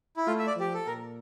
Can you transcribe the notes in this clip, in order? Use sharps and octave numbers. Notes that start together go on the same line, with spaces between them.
E4
A3 F4
E5
D5
F3 G4
A4
A#2 A#4